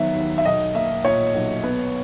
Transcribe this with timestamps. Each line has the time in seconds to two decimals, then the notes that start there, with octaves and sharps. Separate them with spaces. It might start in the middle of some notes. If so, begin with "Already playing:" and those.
Already playing: D#3 F#3 B3 E5
0.15 D#2
0.38 E5
0.45 B1 D#5
0.75 A#3 E5
1.04 A#2 C#5
1.34 B1
1.63 B3